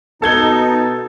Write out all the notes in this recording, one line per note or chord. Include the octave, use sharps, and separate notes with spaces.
B2 D#4 A4 A5 G#6 G7